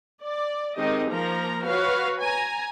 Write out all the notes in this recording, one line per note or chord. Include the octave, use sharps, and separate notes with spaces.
D5
D#3 G#3 C4 D#4 G4 D#5
F3 A#3 A#4 A#5
F#4 B4 C#5 F5
G#5 A#5